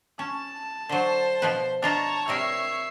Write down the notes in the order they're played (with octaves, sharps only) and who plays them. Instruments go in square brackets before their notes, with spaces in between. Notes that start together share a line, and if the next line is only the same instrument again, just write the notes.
[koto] C#4 [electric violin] A5
[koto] D3 F#3 [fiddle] C5
[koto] B2 F3 B4
[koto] D4 F4 D#5 [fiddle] C#5 [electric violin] A5 A#5
[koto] C3 G3 A#4 [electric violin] E5 C7